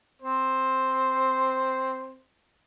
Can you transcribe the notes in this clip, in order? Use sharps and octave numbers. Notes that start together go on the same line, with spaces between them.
C4 C5